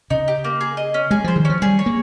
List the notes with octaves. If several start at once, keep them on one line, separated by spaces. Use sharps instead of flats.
C#3 D#4
G4
A#3
G#4
D#5
C#4
G#3 G#4
F3 C5
D#3
F3 C#4
G3 G#4
C#5
A#3